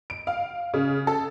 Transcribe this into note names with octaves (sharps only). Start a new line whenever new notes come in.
D7
F5
C#3
A4